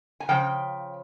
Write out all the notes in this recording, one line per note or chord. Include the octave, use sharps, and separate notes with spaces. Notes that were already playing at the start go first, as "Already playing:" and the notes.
G#5
C#3 F3 G5